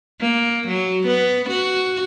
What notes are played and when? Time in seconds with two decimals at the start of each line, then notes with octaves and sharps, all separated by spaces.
0.21 A#3
0.68 F#3
1.07 B3
1.50 F#4